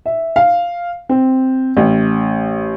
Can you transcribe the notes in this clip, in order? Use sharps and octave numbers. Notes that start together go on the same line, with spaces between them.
E5
F5
C4
A1